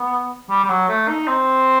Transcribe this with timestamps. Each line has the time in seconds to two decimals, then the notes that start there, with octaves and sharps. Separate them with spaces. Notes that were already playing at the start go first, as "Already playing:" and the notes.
Already playing: B3
0.50 G3
0.64 G3
0.69 F#3
0.89 A3
1.08 D#4
1.28 C4